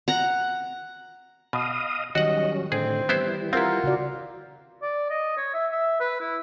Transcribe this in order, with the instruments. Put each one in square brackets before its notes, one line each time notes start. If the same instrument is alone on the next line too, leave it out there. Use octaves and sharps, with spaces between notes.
[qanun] F#5 A#5
[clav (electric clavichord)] B2 [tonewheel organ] D#5 F5 D#6
[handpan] D#3 [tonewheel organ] F#3 G3 C#4 [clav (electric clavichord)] F#4 F#5 [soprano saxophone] D#5
[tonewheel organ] A2 D3 [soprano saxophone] C4 [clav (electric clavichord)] G#4
[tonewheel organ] E3 G3 [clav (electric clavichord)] B3 E4 C5
[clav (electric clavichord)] C4 E4 [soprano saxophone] F4 [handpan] A#4 F#5
[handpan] C#3 F#4 D5
[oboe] D5
D#5
C#5
E5
E5
B4
E4